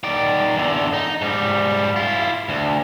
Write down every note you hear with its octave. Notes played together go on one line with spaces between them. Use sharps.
D#3 D5
E2 D3
D#4
G#2 G3
E4 F4
D2